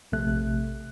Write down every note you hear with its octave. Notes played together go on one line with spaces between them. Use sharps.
A#1 C3 A3 F#6